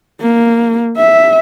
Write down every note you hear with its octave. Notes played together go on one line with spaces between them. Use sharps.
A#3
E5